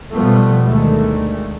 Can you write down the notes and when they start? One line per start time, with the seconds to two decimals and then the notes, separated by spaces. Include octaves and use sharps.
0.14 B2 F3 G3 A3 B3
0.66 D2 D#3 G#3 A3